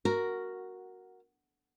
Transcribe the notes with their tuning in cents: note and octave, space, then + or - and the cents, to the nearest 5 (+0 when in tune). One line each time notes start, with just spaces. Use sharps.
F#4 +0 A#4 +0